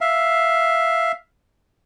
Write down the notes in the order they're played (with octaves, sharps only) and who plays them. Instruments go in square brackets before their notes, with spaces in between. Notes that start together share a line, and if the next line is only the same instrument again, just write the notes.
[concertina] E5 F5